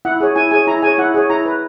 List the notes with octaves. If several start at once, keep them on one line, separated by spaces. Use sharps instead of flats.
E4 F#5
G#4 C#5
E4 G#5
G#4 C#5 G#5
E4 A#5
G#4 C#5 G#5
E4 F#5
G#4 C#5
E4 A#5
B4